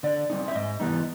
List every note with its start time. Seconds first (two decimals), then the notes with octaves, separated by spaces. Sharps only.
0.03 D3 D5
0.30 G3 C4 D#4
0.48 E5
0.55 G#2 D#5
0.80 E3 G3 B3 D#4